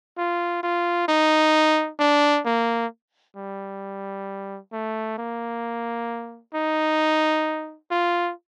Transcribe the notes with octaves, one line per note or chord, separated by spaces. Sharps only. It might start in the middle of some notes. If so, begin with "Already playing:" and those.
F4
F4
D#4
D4
A#3
G3
A3
A#3
D#4
F4